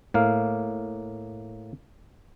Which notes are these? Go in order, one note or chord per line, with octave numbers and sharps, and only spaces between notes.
A2 A#3 F5